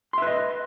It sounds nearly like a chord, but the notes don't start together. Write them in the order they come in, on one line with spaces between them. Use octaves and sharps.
C6 E5 B4 D#5